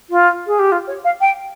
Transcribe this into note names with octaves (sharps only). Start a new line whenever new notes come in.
F4
G#4
G4
F4
C#5
F5
G5